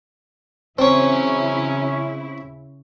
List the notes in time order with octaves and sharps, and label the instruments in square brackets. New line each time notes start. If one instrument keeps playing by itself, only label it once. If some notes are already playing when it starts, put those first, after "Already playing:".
[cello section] C#3 E4 [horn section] E3 F#3 C#4 [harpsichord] C4 C#5